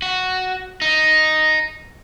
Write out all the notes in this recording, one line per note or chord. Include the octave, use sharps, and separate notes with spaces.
F#4
D#4